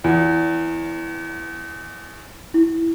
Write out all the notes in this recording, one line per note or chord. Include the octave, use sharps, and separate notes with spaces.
E2
E4